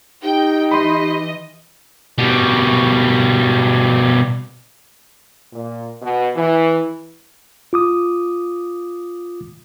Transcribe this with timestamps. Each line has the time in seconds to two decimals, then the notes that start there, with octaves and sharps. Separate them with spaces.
0.23 D#4 G4 G5
0.71 E3 D#5 B5 C6
2.18 B2 G3
5.53 A#2
6.02 B2
6.36 E3
7.73 F4 D6 D#6